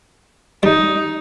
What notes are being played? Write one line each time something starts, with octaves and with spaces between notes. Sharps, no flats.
G3 D#4